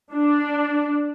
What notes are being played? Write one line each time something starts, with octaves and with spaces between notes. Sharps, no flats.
D4